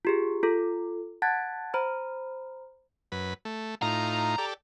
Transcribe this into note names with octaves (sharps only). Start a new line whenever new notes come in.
F4 G4 G#4
F4 A4
F#5 A5 F#6 G#6 A6
C5 A#5 B5
F#2 B4
A3
A2 D#4 F4 A#5
G4 A4 D5